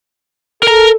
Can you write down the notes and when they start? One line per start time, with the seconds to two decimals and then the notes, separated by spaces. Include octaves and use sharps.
0.63 A4 A#4 A#5